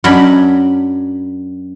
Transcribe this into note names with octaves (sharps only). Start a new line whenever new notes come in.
F#2 F#3 D4 B5